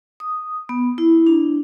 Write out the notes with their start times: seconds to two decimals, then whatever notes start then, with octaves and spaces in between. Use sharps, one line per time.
0.20 D#6
0.69 B3
0.98 E4
1.27 D4